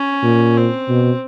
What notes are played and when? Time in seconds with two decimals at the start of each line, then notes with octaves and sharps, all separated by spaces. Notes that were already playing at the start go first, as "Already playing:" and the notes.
Already playing: C#4
0.23 A#2
0.57 C4
0.89 B2